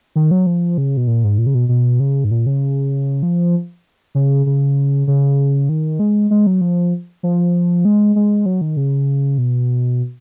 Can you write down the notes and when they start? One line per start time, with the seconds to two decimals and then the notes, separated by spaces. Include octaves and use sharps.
0.16 D#3
0.31 F#3
0.47 F3
0.78 C#3
0.97 B2
1.07 A#2
1.24 G#2
1.38 A#2
1.46 C#3
1.54 B2
1.69 B2
2.00 C#3
2.24 G#2
2.31 A#2
2.46 C#3
3.23 F3
4.15 C#3
4.46 C#3
5.07 C#3
5.69 D#3
5.99 G#3
6.31 G#3
6.47 F#3
6.61 F3
7.23 F3
7.85 G#3
8.16 G#3
8.46 F#3
8.61 D#3
8.77 C#3
9.38 B2